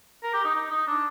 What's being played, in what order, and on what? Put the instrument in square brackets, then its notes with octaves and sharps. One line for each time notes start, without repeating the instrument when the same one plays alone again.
[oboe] A#4
G4
D#4
D#4
D#4
D4